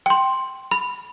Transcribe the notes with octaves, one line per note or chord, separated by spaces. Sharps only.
G5 C6
B5